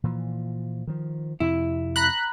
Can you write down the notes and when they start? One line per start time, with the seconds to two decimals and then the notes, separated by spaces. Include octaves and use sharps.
0.04 A#2 E3 F3
0.87 D#3 F3
1.40 F2 C3 E4
1.96 A#5 B5 F#6